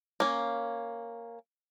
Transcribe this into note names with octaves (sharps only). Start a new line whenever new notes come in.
A#3 C#4